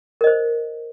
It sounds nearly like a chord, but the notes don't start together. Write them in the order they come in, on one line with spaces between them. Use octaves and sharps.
A#4 D#5 C5